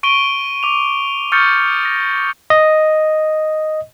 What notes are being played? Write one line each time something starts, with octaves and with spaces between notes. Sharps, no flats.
C#6 D7 D#7 G7
D6 F7
C#6 D#6 F6 G6 A6 C#7
A#6
D#5